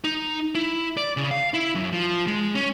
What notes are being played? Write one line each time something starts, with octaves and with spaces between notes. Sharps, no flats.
D#4
E4
D5
C#3
F5
E4
F#2
F3
G#3
C#4